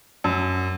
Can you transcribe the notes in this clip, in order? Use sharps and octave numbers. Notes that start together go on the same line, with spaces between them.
F#2